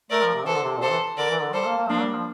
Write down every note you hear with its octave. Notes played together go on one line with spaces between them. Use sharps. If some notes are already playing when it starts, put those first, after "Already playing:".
A3 A#4 D5
F3
C3
E3 A4 C5
D3
C3
A#2
C3 A4 C5
E3
D3 A#4 D5
E3
D3
G3 A4 C5
A#3
A#3
F3 A#3 D4
G3
F3